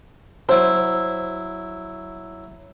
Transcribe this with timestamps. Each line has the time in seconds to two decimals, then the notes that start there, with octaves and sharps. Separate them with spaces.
0.49 F#3 E4 C5